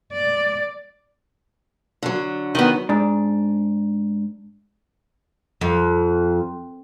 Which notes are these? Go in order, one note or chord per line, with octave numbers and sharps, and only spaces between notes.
D5
D3 F#3
D#3 B3
G#2 D4
F2